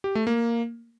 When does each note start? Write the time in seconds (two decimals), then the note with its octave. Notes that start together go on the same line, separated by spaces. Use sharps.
0.04 G4
0.15 A3
0.27 A#3